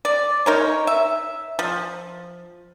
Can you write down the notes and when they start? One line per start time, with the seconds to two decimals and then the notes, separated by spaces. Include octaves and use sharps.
0.05 D5
0.46 D#4 A#4 C#5
0.87 E5
1.59 F3